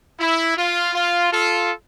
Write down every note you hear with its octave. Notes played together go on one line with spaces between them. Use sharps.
E4
F4
F4
F4 A4